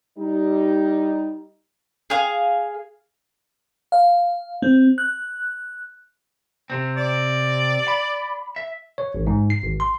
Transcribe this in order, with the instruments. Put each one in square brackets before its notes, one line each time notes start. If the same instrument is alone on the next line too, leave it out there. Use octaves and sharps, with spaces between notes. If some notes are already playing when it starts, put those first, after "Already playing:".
[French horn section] G3 D#4
[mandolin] G#4 F5
[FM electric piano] F5
C4
F#6
[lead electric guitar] C3 C4
[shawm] D5
[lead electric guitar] B5
E5
[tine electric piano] C#5
A1
G#2
C7
G#1
C6